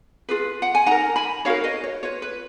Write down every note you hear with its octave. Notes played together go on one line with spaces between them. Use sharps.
F4 G#4 B4
F#5
G#5
D#4 A#4 F#5 A#5
G#5 B5
D#4 F#4 A#4 C#5 F5
B4 D#5
C#5
F4 B4 C#5
B4